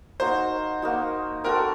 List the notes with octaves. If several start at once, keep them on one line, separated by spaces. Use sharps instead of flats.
A#3 D#4 F#4 C5
A#3 D#4 F#4
C4 F#4 A4 A#4